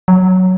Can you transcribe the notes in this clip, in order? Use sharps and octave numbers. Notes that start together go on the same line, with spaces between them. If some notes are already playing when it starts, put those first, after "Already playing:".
F#3